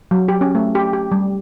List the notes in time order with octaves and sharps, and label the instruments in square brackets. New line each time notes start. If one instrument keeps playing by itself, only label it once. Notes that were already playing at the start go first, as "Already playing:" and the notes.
[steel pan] F#3
G4
C#4
A3
G4
G4
G3